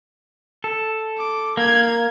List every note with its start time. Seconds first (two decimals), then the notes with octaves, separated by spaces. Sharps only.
0.64 A4
1.17 D6
1.57 A#3 G#6